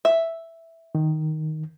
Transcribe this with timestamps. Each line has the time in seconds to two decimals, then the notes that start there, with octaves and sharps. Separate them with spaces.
0.05 E5
0.95 D#3